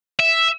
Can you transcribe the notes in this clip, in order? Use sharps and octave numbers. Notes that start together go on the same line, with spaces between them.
E5